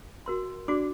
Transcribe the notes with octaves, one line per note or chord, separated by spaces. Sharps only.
F#4 A#4 C6
D4 F#4 D5 D6